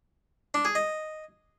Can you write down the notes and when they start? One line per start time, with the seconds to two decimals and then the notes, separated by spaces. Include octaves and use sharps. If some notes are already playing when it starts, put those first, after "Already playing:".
0.54 D4
0.65 G#4
0.75 D#5